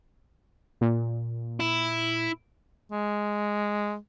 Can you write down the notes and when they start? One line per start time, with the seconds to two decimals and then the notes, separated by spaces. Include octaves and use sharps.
0.81 A#2
1.60 E4
2.91 G#3